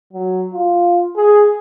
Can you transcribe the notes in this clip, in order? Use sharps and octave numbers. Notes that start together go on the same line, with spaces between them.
F#3
F4
G#4